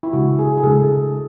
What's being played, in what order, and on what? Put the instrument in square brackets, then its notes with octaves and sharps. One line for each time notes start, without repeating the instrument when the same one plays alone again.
[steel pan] E4
[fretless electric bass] C#3 G#3 D4 [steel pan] F#4
[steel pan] G#4
G#4
[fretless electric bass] C#3 G#3 D4 [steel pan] A4